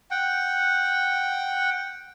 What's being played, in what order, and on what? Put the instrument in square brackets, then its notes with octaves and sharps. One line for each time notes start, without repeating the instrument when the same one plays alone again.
[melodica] F#5 G5